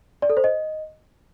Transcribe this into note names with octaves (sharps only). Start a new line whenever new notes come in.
D5
A4
C5
D#5